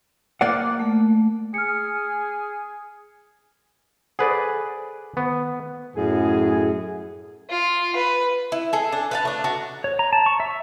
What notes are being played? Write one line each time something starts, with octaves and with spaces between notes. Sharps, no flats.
A#3 D5 F#5
A3
G#4 F6 C#7
G#4 A4 B4 C5 D5 F#5
D#3 B3
F#2 A2 G#4
F4
B4
E4
G#4 A4
D4
B4 F5 A5
A3 D4
D4 F#4
C#5
A#5
A5
C#6
E5